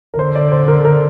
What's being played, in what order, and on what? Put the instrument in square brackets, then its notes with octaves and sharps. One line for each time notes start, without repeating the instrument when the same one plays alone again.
[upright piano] A#4
[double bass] D3 [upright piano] C5
[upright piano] D5
C5
A#4
A#4